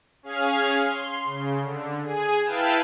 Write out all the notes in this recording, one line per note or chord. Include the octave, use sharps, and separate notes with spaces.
C#4 G#4 F5 F6 G#6
C6
C#3
D3
G#4 G#5
E4 B4 F5 G5 A5